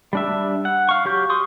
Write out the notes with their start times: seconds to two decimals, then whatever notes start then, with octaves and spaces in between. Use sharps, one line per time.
0.13 G3 D4 E5
0.65 F#5
0.89 F5 C#6
1.05 F#3 G4 C#6 G6
1.30 C6 C#6 D#6